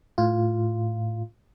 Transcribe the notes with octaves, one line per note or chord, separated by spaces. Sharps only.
A2 F4